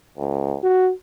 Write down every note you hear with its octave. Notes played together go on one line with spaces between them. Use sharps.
C#2
F#4